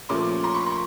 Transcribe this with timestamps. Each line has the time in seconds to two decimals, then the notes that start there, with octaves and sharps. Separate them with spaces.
0.09 A#2 F3 A3 C#4 C6 D6
0.44 A#5 C6
0.54 B5 C#6
0.66 A#5 C6